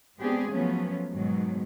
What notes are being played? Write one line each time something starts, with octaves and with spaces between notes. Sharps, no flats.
G#3 B3 C4 D4 G4 G#4
F3 F#3 A3 B3 C#4
G#2 B2 D#3 F#3